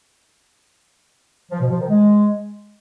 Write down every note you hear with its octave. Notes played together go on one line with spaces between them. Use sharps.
F3
B2
F3
D#3
G#3